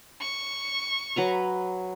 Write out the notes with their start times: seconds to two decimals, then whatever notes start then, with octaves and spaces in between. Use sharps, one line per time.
0.21 C#6
1.16 F#3 B4 A#5